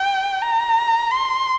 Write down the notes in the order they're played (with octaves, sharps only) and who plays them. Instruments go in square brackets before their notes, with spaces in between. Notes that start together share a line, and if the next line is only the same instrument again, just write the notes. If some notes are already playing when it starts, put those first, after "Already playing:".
Already playing: [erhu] G5
A#5
C6